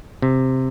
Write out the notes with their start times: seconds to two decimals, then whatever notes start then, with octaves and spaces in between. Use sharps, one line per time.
0.22 C3